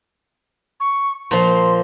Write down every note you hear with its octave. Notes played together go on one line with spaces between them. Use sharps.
C#6
A#2 F3 C6